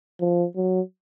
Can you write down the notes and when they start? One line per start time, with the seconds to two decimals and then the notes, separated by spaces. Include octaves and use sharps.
0.20 F3
0.56 F#3